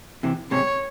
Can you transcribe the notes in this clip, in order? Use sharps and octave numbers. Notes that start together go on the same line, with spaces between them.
C3 E3
G#2 C3 C#5